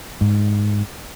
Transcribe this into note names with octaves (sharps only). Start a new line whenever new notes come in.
G#2